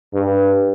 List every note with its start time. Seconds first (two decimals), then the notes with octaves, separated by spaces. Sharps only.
0.14 G2